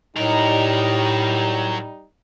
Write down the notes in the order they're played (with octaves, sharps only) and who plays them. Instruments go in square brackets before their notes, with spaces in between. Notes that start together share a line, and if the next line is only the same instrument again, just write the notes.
[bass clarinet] A2 [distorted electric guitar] F#3 A#4 [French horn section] G3 D#4